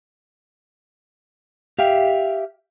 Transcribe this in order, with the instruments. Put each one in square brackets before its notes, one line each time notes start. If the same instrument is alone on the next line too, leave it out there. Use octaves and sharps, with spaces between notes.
[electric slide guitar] G4 E5 F5 G5